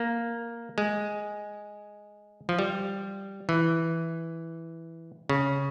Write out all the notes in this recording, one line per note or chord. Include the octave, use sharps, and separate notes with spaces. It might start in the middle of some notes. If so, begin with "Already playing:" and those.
Already playing: A#3
G#3
F3
G3
E3
C#3